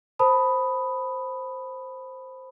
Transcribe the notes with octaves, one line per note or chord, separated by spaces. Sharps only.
A#4 C5 A5 B5 D#6